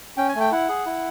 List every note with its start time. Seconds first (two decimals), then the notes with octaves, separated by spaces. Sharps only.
0.17 C#4 G5
0.29 G#5
0.35 A3
0.41 G5
0.52 E4 F#5
0.69 G#4
0.86 E4